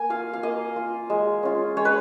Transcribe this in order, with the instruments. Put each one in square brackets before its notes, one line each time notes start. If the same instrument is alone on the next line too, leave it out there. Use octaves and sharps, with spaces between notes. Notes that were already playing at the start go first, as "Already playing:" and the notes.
Already playing: [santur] A#3 G#5
F4 F5
F5
A#3 D#5
F4
G#3
C#4 F4
G#3 C#5
B4